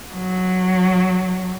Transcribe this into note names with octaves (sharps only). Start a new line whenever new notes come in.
F#3